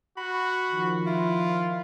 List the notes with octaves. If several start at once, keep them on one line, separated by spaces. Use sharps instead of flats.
F#4 B5
D#3 F3
E4 F4